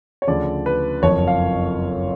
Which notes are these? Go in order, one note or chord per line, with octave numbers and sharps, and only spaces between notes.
C#5
D2 C#3 F3 D5
B4
F#1 F2 F3 C#5
F5